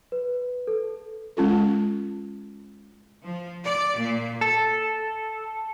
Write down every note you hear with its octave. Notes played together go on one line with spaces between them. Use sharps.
B4
A4
G#3 C#4 F4 A4
F3
D5
A#2
A4